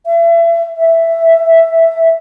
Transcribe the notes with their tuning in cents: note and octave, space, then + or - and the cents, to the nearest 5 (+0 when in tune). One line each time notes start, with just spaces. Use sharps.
E5 +35
E5 +5